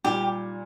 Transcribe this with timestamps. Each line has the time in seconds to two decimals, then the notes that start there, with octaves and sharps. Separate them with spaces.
0.04 A#2 G3 A#3 G4